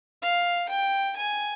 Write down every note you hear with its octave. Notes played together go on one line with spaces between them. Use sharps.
F5
G5
G#5